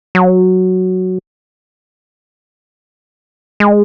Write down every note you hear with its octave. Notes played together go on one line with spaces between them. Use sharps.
F#3
G#3